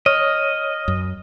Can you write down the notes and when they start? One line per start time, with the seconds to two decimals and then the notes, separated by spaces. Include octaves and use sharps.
0.06 C#5 D#5 F6
0.88 F#2